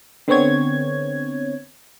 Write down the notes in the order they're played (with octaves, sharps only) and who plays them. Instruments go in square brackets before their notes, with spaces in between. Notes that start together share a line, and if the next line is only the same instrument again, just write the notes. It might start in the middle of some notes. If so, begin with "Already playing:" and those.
[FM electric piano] D3 B3 C4 C#5 G#6